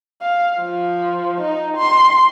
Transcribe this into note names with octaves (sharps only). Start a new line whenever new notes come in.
F5
F3
D#4
C6